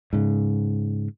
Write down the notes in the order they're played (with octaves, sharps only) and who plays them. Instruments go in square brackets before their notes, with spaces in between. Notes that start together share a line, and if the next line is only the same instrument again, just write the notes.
[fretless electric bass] G#2 C#3